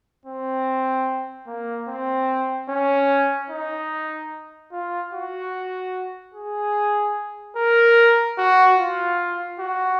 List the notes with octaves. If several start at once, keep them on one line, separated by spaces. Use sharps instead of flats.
C4
A#3
C4
C#4
D#4
F4
F#4
G#4
A#4
F#4
F4
F#4